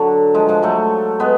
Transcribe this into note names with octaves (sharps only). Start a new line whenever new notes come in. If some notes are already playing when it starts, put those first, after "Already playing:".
Already playing: D3 F#3
F3 G#3
F3 G#3
F#3 A3
G#3 B3